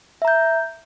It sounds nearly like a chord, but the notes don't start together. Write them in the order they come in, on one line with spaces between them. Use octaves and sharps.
E5 A#5 G6